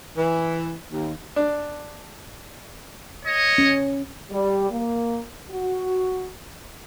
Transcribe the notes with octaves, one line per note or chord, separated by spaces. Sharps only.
E3
D#2
D4
C#5 D#5
C#4
G3
A#3
F#4